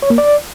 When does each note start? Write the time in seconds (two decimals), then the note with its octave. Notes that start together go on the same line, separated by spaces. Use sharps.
0.02 C#5
0.10 A#3
0.18 D5